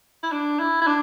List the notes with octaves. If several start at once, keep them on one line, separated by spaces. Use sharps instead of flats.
E4
D4
E4
E4
D4